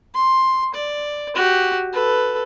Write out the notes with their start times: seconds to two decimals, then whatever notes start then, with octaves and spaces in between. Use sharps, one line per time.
0.14 C6
0.74 D5
1.35 F#4 G4
1.93 A4 B4